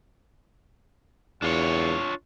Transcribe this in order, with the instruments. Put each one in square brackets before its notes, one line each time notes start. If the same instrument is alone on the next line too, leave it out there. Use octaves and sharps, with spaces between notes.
[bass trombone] E2 [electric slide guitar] D4 F4 C#5